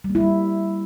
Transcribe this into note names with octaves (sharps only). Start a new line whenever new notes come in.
G3
A#3
E4
G3